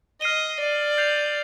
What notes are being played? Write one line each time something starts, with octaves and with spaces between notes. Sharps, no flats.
D#5 F6 C7 D#7 G7
D5
G6 C7 F7